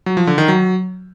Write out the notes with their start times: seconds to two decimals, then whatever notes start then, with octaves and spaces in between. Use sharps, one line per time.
0.06 F#3
0.17 F3
0.27 D3
0.38 D#3
0.48 F#3